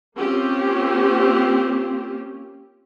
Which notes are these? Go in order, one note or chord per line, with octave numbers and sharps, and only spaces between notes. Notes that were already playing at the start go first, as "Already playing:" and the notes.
A#3 C4 C#4 F4 G4